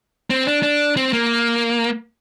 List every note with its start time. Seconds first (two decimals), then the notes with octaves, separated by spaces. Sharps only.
0.30 C4
0.47 D4
0.62 D4
0.97 C4
1.13 A#3